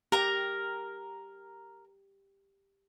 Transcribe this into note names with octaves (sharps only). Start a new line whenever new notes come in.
G4 A#4 A#5